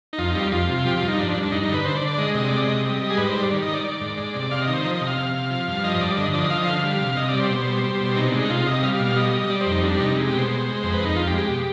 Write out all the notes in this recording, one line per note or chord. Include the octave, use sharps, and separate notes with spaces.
D#4
F2 F4
D#4
G3
F4
F2 F4
C3
F3 G4
G2 F4
D#4
F3 D4
G2
D4
G2 D#4
D#4
D3
B4
D3 C5
D5
D3
D5
G#3 D#5
C3 D#5
G#3 D5
D#5
C3
G3
G3
G#4
G#2 B4
C5
G3
D5
D#3
D#5
D#3
D5
D#3
G#2
G#3
C3
C3 F5
D#5
D#3
C5
F3 D#5
D#5
C3
F5
C3
C3
F3
G2
F3 D#5
G2 D5
D3 D#5
F3 D5
D#5
F3 F5
D#5
D3 F5
G3
C3
C3 D#5
D5
G3
C5
B2
G3
G3
B2
C3 D#4
D4
G#3
D#4
C3 F4
C3 D#5
G3 F5
F5
B2
F5
G3 D#5
G3
G3 D5
C5
F2
D#4
G3 D4
C3 D#4
G#3
G4
B2
C5
G#3
G#3
F2 C5
B4
F2
D#4
F2 F4
G4
G#3
G4
B2